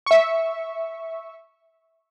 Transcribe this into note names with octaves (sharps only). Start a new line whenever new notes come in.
E5 C#6